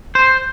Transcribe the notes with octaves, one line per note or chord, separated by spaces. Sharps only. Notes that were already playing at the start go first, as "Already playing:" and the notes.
C5